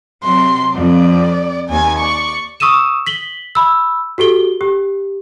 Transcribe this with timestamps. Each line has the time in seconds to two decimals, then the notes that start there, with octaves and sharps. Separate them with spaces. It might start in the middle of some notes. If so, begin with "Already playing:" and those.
0.24 C3 F#3 C6
0.76 F2 D5
1.70 D#2 G#5
1.99 D5 C#6
2.60 C#6 D#6 E6 D#7 E7
3.07 B6 F#7 G7
3.55 B5 E6
4.18 F#4 G4 A4 G7
4.61 G4